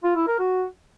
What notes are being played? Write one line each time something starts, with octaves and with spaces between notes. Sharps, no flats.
F4
E4
A#4
F#4